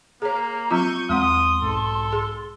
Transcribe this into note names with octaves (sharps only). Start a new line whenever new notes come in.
A#3 G#4 C#5 A#5
F#3 C4 F4 C#6 G6 D#7
E2 G#3 C4 F#5 C6 D#6
B1 G#2 A4
G#4